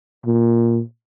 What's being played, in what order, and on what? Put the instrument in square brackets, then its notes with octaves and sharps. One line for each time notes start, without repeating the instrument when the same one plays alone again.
[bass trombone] A#2